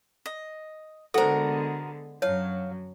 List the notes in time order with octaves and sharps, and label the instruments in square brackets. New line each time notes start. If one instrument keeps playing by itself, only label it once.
[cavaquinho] D#5
[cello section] D3 G#3 B3 [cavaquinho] F#4 A#4 [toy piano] A4 C5
[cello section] F#2 F#3 [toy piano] C#5 A5 [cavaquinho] F5